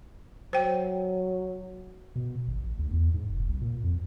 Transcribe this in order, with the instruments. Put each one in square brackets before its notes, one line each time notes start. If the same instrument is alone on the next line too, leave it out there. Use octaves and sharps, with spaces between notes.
[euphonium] F#3 [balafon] C5 G5
[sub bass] B2
G#1
A1
D2
E2
G#2
F1
C2
A#2
F2